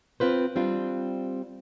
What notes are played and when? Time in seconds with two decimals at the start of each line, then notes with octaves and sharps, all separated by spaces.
0.20 C4 F4 B4 C5
0.56 G3 C4 D4 F4